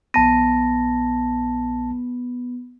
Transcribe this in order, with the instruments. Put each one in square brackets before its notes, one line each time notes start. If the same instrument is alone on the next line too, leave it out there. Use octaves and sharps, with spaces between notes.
[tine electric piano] A#1 A5 A#6 [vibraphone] B3